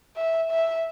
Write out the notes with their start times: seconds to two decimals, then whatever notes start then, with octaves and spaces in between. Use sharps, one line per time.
0.16 E5
0.51 E5